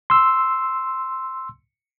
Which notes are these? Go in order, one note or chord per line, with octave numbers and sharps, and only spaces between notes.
C6 E6